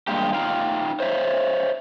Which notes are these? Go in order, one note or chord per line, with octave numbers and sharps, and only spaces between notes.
G2 G#3 A#3 G4
D#4 F4 F5 G5
C5 C#5 E5